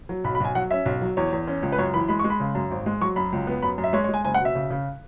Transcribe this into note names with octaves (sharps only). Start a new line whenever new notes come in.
F#3
B1 B5
B5
B1 G#5
F#3 F#5
C#4 E5
B1
F#3
E2 C#5
E2
C#4
C#2
B4
F#2 C#5
E3 B5
G#3 B5
C#6
G#3
B5
C#3
F#2
G#1
G#3
F#3 C#6
F#2 B5
C#2
B3
F#2 B5
F#2
E5
G#3 C#5
C#5
G#3 G#5
F#1 G#5
F#5
B2
E5
C#3
C#3